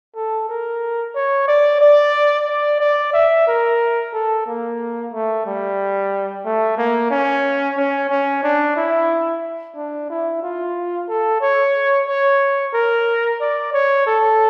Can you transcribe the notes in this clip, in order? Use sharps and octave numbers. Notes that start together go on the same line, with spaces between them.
A4
A#4
C#5
D5
D5
D5
D5
E5
A#4
A4
A#3
A3
G3
A3
A#3
C#4
C#4
C#4
D4
E4
D4
E4
F4
A4
C#5
C#5
A#4
D5
C#5
A4